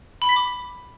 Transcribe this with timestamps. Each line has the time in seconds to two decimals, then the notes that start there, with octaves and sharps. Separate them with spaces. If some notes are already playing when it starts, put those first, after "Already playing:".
0.22 B5
0.29 B6
0.36 D6